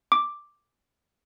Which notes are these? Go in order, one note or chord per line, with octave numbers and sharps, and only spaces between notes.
D6